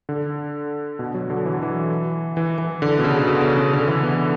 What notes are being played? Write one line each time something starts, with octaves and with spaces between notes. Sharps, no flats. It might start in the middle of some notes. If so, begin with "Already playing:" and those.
D3
B2
F#3
D3
E3
F#3
E3
E3
E3
D3
B2
C#3
C#3
B2
C#3
C#3
D3
E3
B3